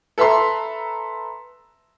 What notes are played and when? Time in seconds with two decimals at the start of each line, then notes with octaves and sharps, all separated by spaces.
0.18 A4 B4 E5 A#5 C6